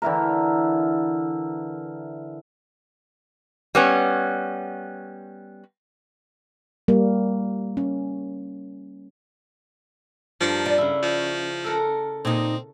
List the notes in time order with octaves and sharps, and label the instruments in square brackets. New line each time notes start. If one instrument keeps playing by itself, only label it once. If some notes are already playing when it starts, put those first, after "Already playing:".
[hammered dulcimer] D3 E3 E4 A#4
[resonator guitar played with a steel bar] G3 B3 C#4
[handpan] G3 A#3
C#4
[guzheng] G2 A#4 D5 [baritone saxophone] F3
[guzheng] G3 B4 [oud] D5
[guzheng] C#3 E4
[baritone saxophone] F3
[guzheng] A4 A#4 F#5
[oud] A#2 D#4 [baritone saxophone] C4